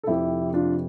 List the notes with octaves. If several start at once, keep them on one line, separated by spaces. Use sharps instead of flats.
A4
F1 F2 C3 E4 G4
D4 F4